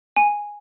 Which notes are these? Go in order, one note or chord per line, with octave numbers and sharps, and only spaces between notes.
G#5